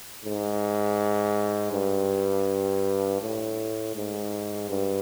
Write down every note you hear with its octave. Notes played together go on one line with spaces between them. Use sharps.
G#2
G2
A2
G#2
G2